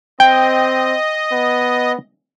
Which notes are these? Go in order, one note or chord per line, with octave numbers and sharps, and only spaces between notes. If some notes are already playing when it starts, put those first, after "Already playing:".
C4 D#5 G5
B3